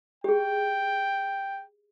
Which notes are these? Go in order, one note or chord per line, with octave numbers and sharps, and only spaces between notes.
G4 G#4 G5